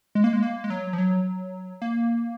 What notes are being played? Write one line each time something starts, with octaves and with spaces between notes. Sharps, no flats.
G#3
A#3
G#3
A#3
G#3
F#3
F3
F#3
A#3